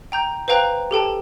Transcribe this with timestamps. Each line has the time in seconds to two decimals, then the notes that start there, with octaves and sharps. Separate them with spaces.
0.12 G5 A#5 G6
0.48 B4 C5 F5 G5 A#5 F#6
0.91 G4 A4 G5 A5